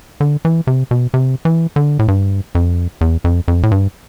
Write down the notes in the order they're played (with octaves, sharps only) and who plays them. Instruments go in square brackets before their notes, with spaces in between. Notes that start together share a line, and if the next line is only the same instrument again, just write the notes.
[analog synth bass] D3
E3
C3
B2
C3
E3
D3
A2
G2
F2
E2
F2
F2
A2
G2